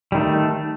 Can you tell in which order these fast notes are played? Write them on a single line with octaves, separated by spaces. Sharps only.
G3 D#3 A3